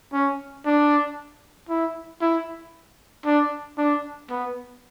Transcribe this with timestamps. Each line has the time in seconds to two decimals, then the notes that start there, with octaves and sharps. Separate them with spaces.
0.13 C#4
0.65 D4
1.69 E4
2.21 E4
3.25 D4
3.77 D4
4.30 B3